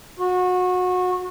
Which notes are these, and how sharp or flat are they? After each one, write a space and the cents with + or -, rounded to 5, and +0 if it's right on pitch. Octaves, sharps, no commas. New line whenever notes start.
F#4 -25